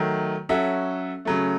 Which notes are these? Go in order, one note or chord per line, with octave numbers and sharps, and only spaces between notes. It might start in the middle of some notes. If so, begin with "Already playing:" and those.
Already playing: D#3 F#3 A3
F#3 C#4 F#4 A4 E5
C#3 F#3 A3